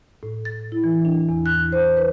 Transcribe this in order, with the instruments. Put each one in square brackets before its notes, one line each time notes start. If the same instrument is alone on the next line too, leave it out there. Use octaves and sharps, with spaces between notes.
[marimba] A2
A6
E4
E3
D4
E2
F#6
C5
B4